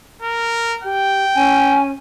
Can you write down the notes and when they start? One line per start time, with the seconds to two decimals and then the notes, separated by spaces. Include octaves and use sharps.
0.22 A#4
0.84 G4 G5
1.34 C#4 G#5